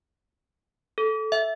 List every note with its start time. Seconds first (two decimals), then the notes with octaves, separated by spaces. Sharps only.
0.98 A4
1.32 E5